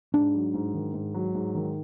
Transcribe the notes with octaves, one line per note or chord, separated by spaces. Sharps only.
G#2 D4
F#3
G#2
D#3
G#2
F#3
G#2
D#3